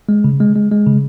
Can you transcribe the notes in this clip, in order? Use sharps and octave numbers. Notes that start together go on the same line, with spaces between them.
G#3
C#3
G#3
G#3
G#3
C#3